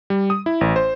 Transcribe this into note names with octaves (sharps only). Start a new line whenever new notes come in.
G3
D#6
E4
A1
C5